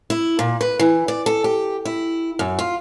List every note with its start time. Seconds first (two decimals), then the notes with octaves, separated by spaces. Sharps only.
0.10 E4
0.39 A#2
0.61 B4
0.79 E3
1.08 D5
1.26 A4
1.44 G4
1.85 E4
2.39 F#2
2.59 F4